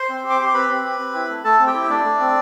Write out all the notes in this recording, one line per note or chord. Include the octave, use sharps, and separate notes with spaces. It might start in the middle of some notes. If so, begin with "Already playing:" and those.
Already playing: C5 C6
C4
G4
D6
G4 C6
C4 B4 B5
C4
G4
C4
E4
A3
A3 A4 A5
C4
G4 G5
E4
E5
A3 D4 D5
A3
C4